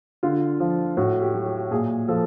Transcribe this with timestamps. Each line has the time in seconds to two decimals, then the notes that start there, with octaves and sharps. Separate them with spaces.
0.23 D3 F4
0.60 F3
0.97 A2 F#4
1.22 G4
1.34 F#3
1.46 G4
1.71 A#2 G#4
2.08 F3 A4